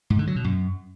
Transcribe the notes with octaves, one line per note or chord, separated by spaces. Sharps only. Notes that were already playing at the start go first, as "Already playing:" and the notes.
G#2
D3
F#3
B2
F#2